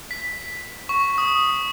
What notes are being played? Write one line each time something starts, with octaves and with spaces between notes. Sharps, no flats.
B6
C#6
D#6